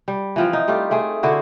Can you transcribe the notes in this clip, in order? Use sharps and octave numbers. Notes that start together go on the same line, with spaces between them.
G3
E3 F3 C4
D#4
G3 A3 F4 G4
A3 C4 G#4
D3 E4 F#4 C5